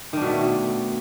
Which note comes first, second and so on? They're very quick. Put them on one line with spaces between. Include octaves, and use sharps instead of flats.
D#3 D4 B2 A3